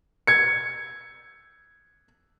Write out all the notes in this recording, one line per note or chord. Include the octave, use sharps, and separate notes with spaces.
G#6 C#7